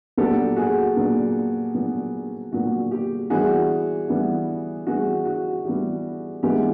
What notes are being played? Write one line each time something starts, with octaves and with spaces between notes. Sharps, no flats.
A#2 F#3 B3 D4 G4 A4
F#4 G#4
A#2 F#3 B3 D4
A#2 F#3 B3 D4
A#2 F#3 B3 D4 F#4
G4
E3 G3 B3 F#4 G#4
E3 G3 B3
E3 G3 B3 F#4 G#4
F#4
E3 G3 B3 G4
E3 G#3 B3 D4 G4